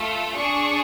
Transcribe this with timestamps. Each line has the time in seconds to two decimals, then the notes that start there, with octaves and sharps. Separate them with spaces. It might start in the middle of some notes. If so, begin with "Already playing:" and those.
Already playing: A3 F4 A4
0.34 D4 G#4 C#6